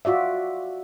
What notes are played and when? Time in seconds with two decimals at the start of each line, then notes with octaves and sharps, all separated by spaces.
0.05 F4 F#4 D5 E5